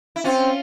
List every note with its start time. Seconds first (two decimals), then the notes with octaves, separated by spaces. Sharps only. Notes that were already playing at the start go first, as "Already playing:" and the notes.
0.16 E4
0.24 C4 C#4 F4